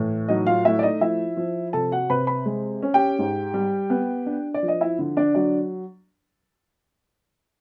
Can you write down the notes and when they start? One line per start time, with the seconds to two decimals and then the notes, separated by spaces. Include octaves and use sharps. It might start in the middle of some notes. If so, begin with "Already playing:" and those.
Already playing: A2 E3
0.28 F#3 D#4 D#5
0.47 F4 F5
0.65 A3 E4 E5
0.79 D5
0.83 D#4 D#5
1.01 F3 E4 E5
1.37 F3
1.73 C3 A4 A5
1.91 F#4 F#5
2.10 C3 B4 B5
2.27 B4 B5
2.46 G#3
2.83 C#4
2.94 G4 G5
3.19 G#2
3.54 G3
3.90 B3
4.26 D4
4.54 D5
4.63 F3
4.68 D#5
4.81 E4 E5
4.99 D3
5.17 D4 D5
5.35 F#3 D4 D5